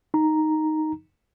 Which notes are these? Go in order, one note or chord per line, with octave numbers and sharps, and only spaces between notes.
D#4 A#5